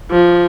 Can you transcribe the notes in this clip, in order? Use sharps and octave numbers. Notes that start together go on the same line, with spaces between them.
F3